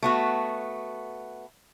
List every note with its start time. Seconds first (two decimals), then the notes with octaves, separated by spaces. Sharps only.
0.03 A3 B3 F#4